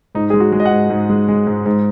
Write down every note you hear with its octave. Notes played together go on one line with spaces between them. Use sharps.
G#2 D#4
G#3 G#4
F#4
G#3
D#5
F#5
G#2
G#2
G#3
G#3
G#2
G#2